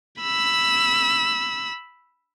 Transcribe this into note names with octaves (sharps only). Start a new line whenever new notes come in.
B5 E6